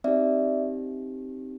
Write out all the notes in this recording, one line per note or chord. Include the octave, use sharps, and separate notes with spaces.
C4 D#4 G4 D5 E5